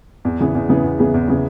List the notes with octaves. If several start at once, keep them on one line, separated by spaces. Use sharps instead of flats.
E2
C#3 E3 B3 G#4
E2
C#3 E3 B3 G#4
E2
C#3 E3 B3 G#4
E2
C#3 E3 B3 G#4